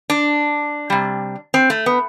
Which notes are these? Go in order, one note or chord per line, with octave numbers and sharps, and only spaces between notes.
D4
C3 G3
C4
A3
B3